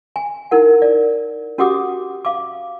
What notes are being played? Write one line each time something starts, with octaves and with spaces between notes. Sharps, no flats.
G#5
D#4 E4 A#4 F#5
D5
C#4 F#4 G4 F#5 D6 D#6
F5 D6